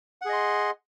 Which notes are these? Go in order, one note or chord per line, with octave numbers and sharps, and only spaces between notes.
G#4 D#5 F#5 C6